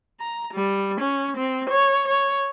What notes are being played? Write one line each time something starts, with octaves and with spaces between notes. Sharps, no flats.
A#5
G3
C#4
C4
C#5
C#5